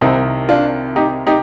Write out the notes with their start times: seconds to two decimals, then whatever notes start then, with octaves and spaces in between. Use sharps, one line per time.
0.01 C2 C3 D#3 C4 D#4
0.49 D4 F4
0.96 D#4 G4
1.27 D#4 G4